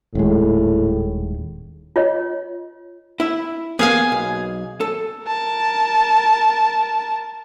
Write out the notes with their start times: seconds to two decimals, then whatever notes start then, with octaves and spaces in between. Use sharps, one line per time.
0.15 D#1 A2 G#3
1.96 F4 C#5 D#5
3.20 E4 E5
3.79 A#3 B3 G#4 F5 G#5
4.12 B1
4.81 A4
5.27 A#4 A5